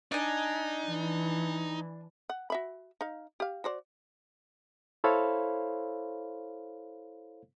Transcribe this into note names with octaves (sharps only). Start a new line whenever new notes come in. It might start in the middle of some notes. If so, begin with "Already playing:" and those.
D4 D#4 G#5
E3
F#5
F#4 E5 B5
D#4 F5
G4 F5
F#4 C5 D5
E4 A4 C5 C#5 F5 B5